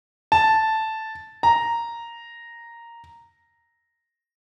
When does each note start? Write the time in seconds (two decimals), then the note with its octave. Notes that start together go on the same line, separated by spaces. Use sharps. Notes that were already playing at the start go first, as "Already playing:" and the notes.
0.32 A5
1.43 A#5